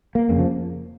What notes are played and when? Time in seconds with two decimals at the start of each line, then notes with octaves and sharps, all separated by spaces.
0.15 A#3
0.29 F1 F2 C#3 A#3
0.39 F3